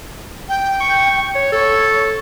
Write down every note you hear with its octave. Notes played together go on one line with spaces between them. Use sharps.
G5
C#6
C#5
A4 C#5